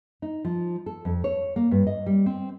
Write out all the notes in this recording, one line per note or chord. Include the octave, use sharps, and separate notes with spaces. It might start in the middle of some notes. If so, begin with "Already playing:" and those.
D#4
F3
A4
F2
C#5
A#3
G2
D#5
G3
C4